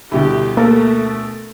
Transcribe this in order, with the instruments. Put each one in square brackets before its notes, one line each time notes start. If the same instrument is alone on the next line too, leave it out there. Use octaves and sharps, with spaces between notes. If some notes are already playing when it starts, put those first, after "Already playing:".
[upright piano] D2 B2 [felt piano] D3 G3 E4 [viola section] G4
[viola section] A3 [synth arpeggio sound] A#3 [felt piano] A4 A#4